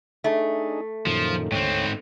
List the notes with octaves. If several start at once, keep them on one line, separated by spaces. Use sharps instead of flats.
A3 D4 D#4 G#4
F#2 A#2 D#3 F3
D2 G#2 C4 C#5 G5